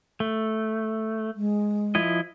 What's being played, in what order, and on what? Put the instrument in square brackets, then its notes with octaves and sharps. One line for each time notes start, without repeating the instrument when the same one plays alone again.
[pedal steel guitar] A3
[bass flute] G#3
[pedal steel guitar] F3 E4 D#5